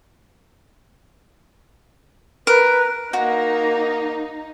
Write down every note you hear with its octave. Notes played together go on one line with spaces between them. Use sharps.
A#4 B4
A#3 D#4 F#4 A#5